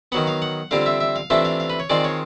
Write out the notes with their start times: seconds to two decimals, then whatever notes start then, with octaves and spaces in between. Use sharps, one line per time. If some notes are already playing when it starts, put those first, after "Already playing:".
0.12 D#3 F#3 B3 F#5
0.27 F5
0.42 F#5
0.71 D3 G3 C4 F4 F5
0.86 E5
1.01 E5
1.16 F5
1.30 C3 E3 A3 D4 F4 E5
1.45 F5
1.60 F5
1.70 B4
1.80 C#5
1.90 D#3 G#3 C4 F4 D5
2.04 C#5